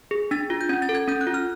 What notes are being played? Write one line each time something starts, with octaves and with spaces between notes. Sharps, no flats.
G#4
D4 A6
F4
G6
C#4 G#6
A6
A4
G#6
C#4 G6
F#6
F4
F6